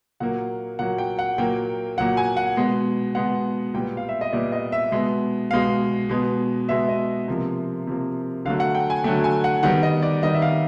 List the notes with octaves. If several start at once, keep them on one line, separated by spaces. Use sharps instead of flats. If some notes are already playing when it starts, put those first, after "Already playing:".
A#2 F#3 A#3 F#5
A#2 F#3 A#3 F#5
G5
F#5
A#2 F#3 A#3 G5
A#2 F#3 A#3 F#5
G#5
F#5
B2 G#3 B3
B2 G#3 B3 F#5
A#2 G3 B3 G5
F5
E5
D#5
A#2 G3 B3 D5
D#5
E5
B2 G#3 B3
B2 G#3 B3 F5
B2 G#3 B3
B2 G#3 B3 E5
D#5
C3 F3 A#3
C3 F3 A#3
D3 F#3 A3 F5
F#5
G5
G#5
D3 F#3 A3 G5
G#5
F#5
D#3 G3 B3 F#5
D#5
D5
D#3 G3 B3 D#5
E5
F5